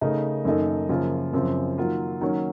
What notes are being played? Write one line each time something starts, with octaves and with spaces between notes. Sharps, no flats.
C#3 A3 D#4 A#4
F#2 D#3 A#3 D#4 A4
F#2 C#3 F3 A#3 F4
F#2 C#3 F3 C4
D#3 F#3 A#3 F4
D#3 F#3 A#3 C#4